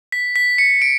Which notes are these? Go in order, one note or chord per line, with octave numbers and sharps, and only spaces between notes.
B6
B6
C#7
D7